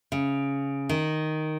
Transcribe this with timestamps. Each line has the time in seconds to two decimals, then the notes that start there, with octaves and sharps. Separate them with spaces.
0.12 C#3
0.89 D#3